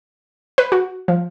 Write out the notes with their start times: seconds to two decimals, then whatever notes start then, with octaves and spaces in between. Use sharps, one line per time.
0.58 B4
0.72 F#4
1.08 F3